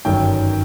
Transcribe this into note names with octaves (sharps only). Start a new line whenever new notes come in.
G1 F#2 D#3 G5